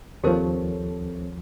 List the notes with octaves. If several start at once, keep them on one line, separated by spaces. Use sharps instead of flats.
D#2 F3 C4 G4 A4 A#4 C5 C#5